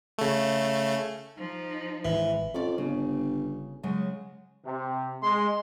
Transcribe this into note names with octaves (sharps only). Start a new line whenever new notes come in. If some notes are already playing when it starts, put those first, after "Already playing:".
C#3 A3
F3 D#4
G#1 E3
F2 C#4 F4 D5
G1 C#3
C#3 F#3 G#3
C3
G#3 C6